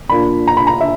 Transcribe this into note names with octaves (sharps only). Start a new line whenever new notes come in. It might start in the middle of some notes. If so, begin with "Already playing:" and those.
A#2 A#3 D4 B5
A#5
B5
A#5
E5